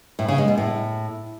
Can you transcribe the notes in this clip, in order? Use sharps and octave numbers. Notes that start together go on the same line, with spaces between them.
A2
C#3
G#3
B2
A2